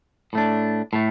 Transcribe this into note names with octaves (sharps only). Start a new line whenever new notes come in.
A2 A3 D4
A2 A3